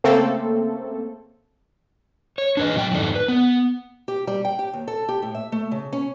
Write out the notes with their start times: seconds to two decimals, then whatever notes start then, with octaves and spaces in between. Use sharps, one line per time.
0.04 C#3 A3 A#3 C4 A4
2.38 C#5
2.57 D4 B4 D#5
2.75 B2 F#3 G5
2.91 F2 G#2 D#3 B3 A4 D5
3.15 B4
3.28 B3
4.08 G4
4.27 G3
4.45 G5
4.59 G4
4.73 D#2
4.88 A4
5.09 G4
5.22 A2
5.34 E5
5.52 A3
5.71 C#3
5.93 C#4